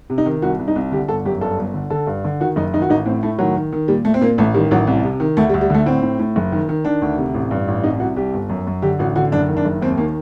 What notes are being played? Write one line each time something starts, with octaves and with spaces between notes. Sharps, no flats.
C3
D#4
D#3
C2 F#4
C2
D#4
C2
D3 G4
G1 A4
F#2 G4
G2 A4
G1
D3
D3 A4
G2
D3
D#3 F#4
F#1 D#4
D#3 D#4
F#4
A1 D#4
A2 C4
A2 A3
D#3 F#3
D#3
D#3
A#2 G3
A#2 A3
C4
A#2 A#3
A1 A3
D#3 G3
A1 F#3
C2
C3
D#3
D2 A3
G3
D2
G3
D3 A3
A2 C4
A2
A2
F#1
D#3
D#3
D#3 D4
D2
C3
A1
G2
A1
C2 D#4
C2 F#4
C2 G4
G1
F#2
F#2
D3 G4
A1 F#4
D3 F#4
F#1 D4
D#3
D4
F#1
D#2 C4
D#3 A#3